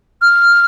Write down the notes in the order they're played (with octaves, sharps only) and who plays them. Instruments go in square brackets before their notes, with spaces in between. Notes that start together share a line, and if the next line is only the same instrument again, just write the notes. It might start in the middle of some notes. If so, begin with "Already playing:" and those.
[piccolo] F6